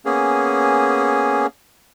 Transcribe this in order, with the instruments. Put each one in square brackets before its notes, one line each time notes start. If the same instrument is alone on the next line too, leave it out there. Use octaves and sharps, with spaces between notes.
[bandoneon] A#3 B3 C#4 G#4